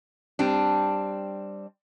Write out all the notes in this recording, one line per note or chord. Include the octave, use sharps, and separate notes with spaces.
G3 C4 D4